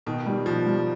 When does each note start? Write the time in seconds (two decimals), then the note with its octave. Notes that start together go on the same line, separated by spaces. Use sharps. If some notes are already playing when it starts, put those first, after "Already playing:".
0.06 B2 D#3
0.26 G3
0.46 B2 F3
0.67 G3